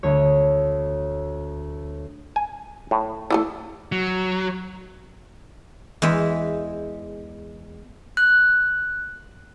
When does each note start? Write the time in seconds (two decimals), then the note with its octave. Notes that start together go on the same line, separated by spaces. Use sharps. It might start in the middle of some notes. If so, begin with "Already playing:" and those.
0.03 D2 C#5
2.36 G#5
2.91 A2
3.30 E3 F#3 A3
3.92 F#3
6.02 E2 G#3 E5
8.17 F#6